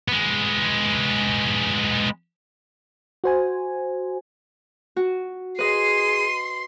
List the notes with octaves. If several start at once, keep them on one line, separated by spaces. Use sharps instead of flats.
G#3 B3
F#4 C5 G#5
F#4
G#4 B4 D#5 C6 C7 D#7